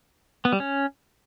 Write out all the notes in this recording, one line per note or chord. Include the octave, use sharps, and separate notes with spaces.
B3
G3
C#4